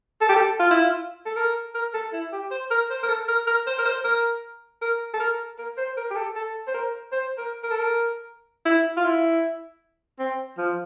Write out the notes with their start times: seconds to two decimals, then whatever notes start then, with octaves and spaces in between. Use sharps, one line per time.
0.21 A4
0.29 G4
0.36 A4
0.59 F4
0.71 E4
0.83 F4
1.26 A4
1.36 A#4
1.75 A#4
1.94 A4
2.13 E4
2.32 G4
2.51 C5
2.71 A#4
2.90 C5
3.03 A#4
3.09 A4
3.28 A#4
3.47 A#4
3.67 C5
3.78 A#4
3.85 C5
4.04 A#4
4.82 A#4
5.14 A4
5.20 A#4
5.58 A#4
5.78 C5
5.97 A#4
6.10 G4
6.16 A4
6.35 A4
6.68 C5
6.74 A#4
7.12 C5
7.38 A#4
7.63 A#4
7.71 A4
7.79 A#4
8.65 E4
8.97 F4
9.04 E4
10.19 C4
10.58 F3